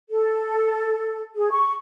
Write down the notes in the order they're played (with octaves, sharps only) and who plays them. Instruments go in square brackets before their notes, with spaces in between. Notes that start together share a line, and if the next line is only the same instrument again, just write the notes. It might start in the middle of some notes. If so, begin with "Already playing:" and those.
[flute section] A4
G#4
C#6